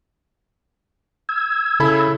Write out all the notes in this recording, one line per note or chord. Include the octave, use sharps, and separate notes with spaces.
E6 G#6
C#3 E4 A4 B5